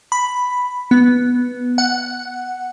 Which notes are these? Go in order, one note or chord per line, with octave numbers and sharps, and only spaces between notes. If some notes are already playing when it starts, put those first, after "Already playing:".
B5
B3
F#5